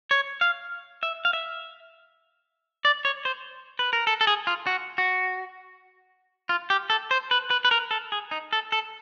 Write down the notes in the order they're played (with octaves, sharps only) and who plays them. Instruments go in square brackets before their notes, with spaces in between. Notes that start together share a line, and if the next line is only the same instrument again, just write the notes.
[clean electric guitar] C#5
F5
E5
F5
E5
D5
C#5
C5
B4
A#4
A4
A4
G#4
F4
F#4
F#4
F4
G4
A4
C5
B4
B4
B4
A#4
A4
G#4
D#4
A4
A4